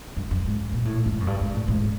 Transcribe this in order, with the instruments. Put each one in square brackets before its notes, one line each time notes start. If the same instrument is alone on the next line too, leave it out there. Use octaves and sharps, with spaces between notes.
[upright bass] G2
F#2
G#2
A#2
A2
G#2
F#2
G2
G#2
A2
G#2